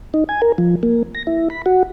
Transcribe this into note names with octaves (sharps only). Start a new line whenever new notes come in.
D#4
G#5
A#4
F3
A#3
A#6
E4
B5
F#4